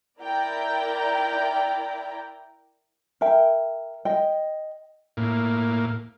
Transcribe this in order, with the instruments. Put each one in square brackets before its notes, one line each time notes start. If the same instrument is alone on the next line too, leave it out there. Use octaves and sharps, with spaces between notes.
[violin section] E4 A#4 D5 G5 A#5
[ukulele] A#4 E5 G5
D#5 G5
[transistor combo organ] A2 A#3